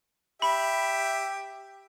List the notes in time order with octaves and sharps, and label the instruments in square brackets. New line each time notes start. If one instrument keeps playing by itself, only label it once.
[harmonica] G4 E5 [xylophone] B5